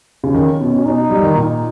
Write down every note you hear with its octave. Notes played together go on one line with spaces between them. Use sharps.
C#3
D#3 C#4
B2
B2
B2 D#4
G3
D#3
A#2 D#4